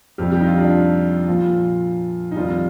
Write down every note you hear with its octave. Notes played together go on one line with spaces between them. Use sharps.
F2 C3 G3 G4
G4
D#4
F4
D4
A#2 F3 F4
D#4
F2 C3 D#3 G3 F4